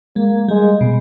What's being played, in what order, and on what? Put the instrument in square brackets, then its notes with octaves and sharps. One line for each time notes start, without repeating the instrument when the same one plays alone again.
[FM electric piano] G#3 [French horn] A#3
[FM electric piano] G3 [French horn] G#3
[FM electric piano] B2